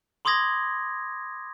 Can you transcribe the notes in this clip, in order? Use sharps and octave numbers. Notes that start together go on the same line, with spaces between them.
B5 C6 D6 D#6 G#6 A#6